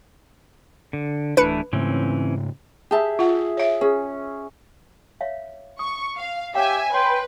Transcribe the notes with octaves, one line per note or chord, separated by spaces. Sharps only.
D3
D1 E3 A3 D4 E4 B4 B5 C#7
G#2 C#3 E3 A3 C4 C#4
G4 G#4 E5 A5
F4 F#5
C#5 E5
C#4 G#4
C#5 E5 F5
C#6 D#6
F5
G4 C#5 E5 F5 G5 G#5
B4 C#5 G5 C6